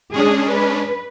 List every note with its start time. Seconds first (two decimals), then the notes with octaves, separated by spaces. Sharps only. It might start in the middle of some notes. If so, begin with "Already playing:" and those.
0.14 G#3 C#4 D4 G#4
0.52 B4